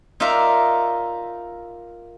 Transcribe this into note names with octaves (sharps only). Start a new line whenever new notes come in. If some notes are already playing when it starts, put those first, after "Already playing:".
D#4 F4 A#4 D5 E5